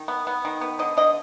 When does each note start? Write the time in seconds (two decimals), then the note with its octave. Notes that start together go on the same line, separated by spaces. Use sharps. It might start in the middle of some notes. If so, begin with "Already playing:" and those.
Already playing: D#3
0.08 B3
0.27 B3
0.45 D#3
0.61 B3
0.79 D3 D#5
0.97 D3 D#5